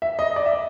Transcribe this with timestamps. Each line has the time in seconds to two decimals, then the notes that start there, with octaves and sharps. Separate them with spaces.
0.02 E5
0.19 D#5
0.36 D5
0.46 E5
0.53 D#5